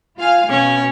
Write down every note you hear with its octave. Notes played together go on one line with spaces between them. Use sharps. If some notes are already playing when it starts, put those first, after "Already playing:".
F4 F5 G#5
B2 C#4